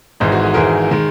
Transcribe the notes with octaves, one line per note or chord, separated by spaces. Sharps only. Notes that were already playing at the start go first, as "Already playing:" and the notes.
G#1 G#2 E3 G#3 D#4
F#4
G#4
G#1 G#2 E3 G#3 A#4
D#3 G#3